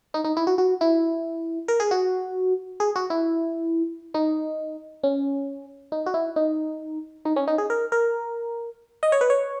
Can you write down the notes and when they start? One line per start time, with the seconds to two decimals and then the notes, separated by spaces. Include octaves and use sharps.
0.14 D#4
0.24 D#4
0.37 E4
0.47 F#4
0.58 F#4
0.81 E4
1.68 A#4
1.80 G#4
1.91 F#4
2.80 G#4
2.96 F#4
3.10 E4
4.14 D#4
5.03 C#4
5.92 D#4
6.06 F#4
6.14 E4
6.36 D#4
7.25 D#4
7.36 C#4
7.47 D#4
7.58 G#4
7.70 A#4
7.92 A#4
9.03 D#5
9.12 C#5
9.21 B4
9.30 C#5